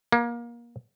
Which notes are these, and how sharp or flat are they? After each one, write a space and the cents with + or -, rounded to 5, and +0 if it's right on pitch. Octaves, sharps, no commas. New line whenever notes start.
A#3 +25